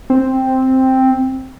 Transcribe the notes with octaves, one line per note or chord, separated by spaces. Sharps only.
C4